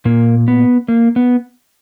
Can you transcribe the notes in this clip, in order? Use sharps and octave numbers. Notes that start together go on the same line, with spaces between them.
A#2 A#3
B3
A#3
B3